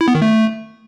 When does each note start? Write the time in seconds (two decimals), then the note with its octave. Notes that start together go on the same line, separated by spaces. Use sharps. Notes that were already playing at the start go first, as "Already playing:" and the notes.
0.01 E4
0.08 B3
0.15 D#3
0.22 A3